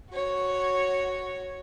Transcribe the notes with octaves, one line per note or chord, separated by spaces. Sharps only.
F#4 C#5